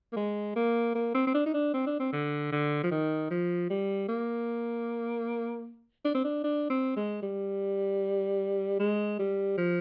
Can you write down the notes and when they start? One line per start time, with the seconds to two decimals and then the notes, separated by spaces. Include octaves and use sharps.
0.12 A#3
0.16 G#3
0.56 A#3
0.95 A#3
1.14 C4
1.27 C4
1.34 D4
1.46 D#4
1.54 D4
1.74 C4
1.86 D4
2.00 C4
2.13 D3
2.52 D3
2.83 F3
2.91 D#3
3.30 F3
3.70 G3
4.08 A#3
6.05 D4
6.14 C4
6.24 D4
6.44 D4
6.70 C4
6.96 G#3
7.22 G3
8.79 G#3
9.19 G3
9.57 F3